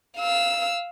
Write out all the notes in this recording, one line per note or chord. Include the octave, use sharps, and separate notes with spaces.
F5 E6